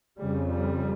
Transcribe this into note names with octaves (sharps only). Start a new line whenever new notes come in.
F2 C#3 G3
G3